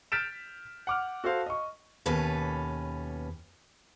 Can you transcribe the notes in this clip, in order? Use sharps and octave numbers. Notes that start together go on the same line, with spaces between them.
F6 G6 A6 B6 D7 E7
F#5 D6 F6
F#4 A4 C5 F5
D#5 C#6
D#2 B2 C#4 A4 B4